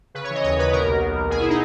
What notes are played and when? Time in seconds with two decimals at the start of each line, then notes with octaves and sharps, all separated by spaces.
0.15 C#3 B4
0.24 C#5
0.30 E3 D#5
0.44 D#2 C#5
0.58 D#2 B4
0.72 B2 A#4
0.86 B1
1.02 B2
1.15 B1
1.30 B2 G#4
1.40 E4
1.50 D#4